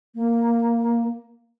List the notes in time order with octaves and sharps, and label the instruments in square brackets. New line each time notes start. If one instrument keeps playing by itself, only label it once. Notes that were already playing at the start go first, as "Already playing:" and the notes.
[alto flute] A#3